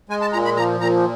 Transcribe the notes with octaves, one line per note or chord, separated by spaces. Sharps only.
G#3 G#5
A5
A#2 A#5
B5
F3 A#5
A#2 A#5